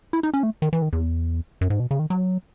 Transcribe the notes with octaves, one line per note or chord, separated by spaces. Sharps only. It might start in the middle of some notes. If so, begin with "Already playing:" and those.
E4
D#4
C#4
A3
D#3
E3
D#3
E2
F#2
G#2
B2
C#3
D#3
F#3